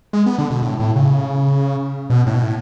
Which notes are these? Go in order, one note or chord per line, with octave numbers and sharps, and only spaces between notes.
G#3
B3
D3
B2
A2
A2
C#3
B2
A2
B2
A2